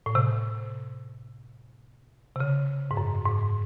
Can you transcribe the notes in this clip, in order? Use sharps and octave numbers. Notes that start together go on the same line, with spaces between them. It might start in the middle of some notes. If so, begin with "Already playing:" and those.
A2
C3
C3
C#3
G#2
F#2
G#2